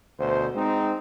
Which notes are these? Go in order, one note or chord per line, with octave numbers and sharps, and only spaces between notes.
D2 B2 C5
G#3 C4 D#4